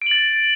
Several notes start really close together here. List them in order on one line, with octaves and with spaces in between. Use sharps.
D7 F#7 A6